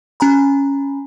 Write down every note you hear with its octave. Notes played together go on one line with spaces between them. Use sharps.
C#4 G#5 A#5 B5